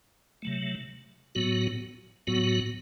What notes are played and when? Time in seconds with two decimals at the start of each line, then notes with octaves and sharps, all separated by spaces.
0.42 C3 F#3 A3
1.35 A2 F#3 B3 F#4
2.27 A2 F#3 B3 F#4